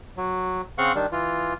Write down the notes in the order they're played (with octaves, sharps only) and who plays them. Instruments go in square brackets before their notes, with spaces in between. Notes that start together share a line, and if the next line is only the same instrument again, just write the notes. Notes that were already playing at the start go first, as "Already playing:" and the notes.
[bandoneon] F#3
C#3 C4 F5 F#5 C6 C#6
D#3 G3 D4
E3 F4